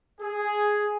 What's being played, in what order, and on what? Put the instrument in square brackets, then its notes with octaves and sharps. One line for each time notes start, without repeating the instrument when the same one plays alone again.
[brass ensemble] G#4